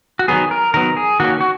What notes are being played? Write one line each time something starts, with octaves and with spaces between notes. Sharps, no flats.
F#4
D#3 F#3 B3 G#4
A#4
D#3 F#3 B3 A#4
G#4
D#3 A#3 C#4 F#4
F#4